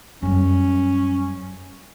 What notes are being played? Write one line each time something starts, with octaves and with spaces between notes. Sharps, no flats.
F#2 G3 C#4